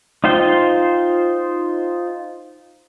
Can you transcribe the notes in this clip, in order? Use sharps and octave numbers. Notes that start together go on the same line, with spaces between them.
D#4 F4 C5 G5